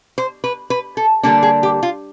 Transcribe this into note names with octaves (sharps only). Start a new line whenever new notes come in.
C5
B4
B4
A4
D3 G3 A#3 D4 A4
G#4
G4
F4